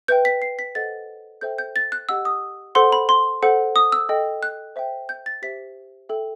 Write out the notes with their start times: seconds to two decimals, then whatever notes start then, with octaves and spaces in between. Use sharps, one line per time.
0.08 B4 E5 G5 G6
0.25 B6
0.42 C7
0.59 B6
0.75 A4 C5 D#5 F#5 A6
1.41 A4 C5 E5 G5 G6
1.58 G6
1.76 A6
1.92 F#6
2.09 G4 D#5 F#5 E6
2.25 D#6
2.75 A4 C5 F#5 C6
2.92 B5
3.09 C6
3.42 A4 C5 F#5
3.76 D#6
3.92 E6
4.09 A4 D#5 G5
4.43 F#6
4.76 C5 E5 G5
5.09 G6
5.26 A6
5.42 G4 C5 E5 B6
6.09 A4 E5 G5